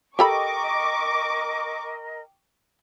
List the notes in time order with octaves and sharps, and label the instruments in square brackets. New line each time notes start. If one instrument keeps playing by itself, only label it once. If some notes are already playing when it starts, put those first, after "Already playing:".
[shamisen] G4 A4 B5 [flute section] A#4 D#5 [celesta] G5 [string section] C#6 D6